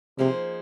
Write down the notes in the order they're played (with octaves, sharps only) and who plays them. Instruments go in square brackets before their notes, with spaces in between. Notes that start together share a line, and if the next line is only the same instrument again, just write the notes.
[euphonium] C3 [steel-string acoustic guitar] F3 A#3 D#4 G#4 C5